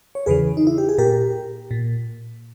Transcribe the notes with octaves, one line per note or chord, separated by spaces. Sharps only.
C#5
E2 C#3 E3 G#4 B4
D#4
E4
G4
G#4
A#2 G4 A#4
A#2